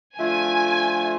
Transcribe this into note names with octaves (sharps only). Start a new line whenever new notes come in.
D3 F3 A3 F4 G#5